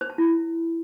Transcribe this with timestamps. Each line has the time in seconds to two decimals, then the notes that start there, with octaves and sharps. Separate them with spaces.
0.01 C5
0.10 A5
0.18 E4